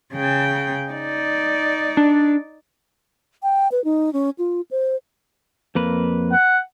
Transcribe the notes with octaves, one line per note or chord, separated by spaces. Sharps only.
C#3 G5
D#4 D5
D4
G5
B4
D#4
C#4
F4
C5
F2 A#3 B4
F#5